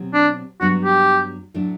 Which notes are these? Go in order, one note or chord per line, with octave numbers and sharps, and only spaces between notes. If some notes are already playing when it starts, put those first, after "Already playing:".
Already playing: B2 F#3 C4 G4
D4
G2 F#3 B3 D4 F#4
G4
A2 F#3 A3 D4